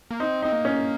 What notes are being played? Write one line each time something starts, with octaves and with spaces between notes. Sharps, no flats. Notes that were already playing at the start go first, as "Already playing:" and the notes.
A#3
C4 D#4
C4 D#4
A#3
C#4